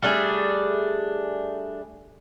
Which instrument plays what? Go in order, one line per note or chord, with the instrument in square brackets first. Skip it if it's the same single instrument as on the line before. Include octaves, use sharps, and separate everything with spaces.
[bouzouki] G3 A3 D4 G#4